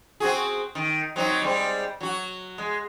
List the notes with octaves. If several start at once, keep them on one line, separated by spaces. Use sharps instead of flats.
C4 F#4 G#4
D#3
F#3 C4 D#4
G3 G#3 C4
F#3 F#4
G#3